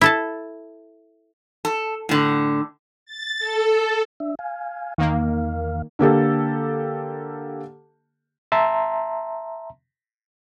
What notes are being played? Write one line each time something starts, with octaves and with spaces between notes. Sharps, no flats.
E4 A4 A5
A4
A2 D3
A6
A4
D4 E5
F5 G#5
E2 D#3 A#3 F5
D3 A#3 G4 A4
E5 A5 A#5 C6